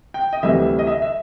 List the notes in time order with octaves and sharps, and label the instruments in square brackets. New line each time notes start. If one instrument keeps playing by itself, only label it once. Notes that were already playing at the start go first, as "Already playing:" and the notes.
[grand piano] G5
D#5
D2 C3 E3 G3 E5
D#5
E5
E5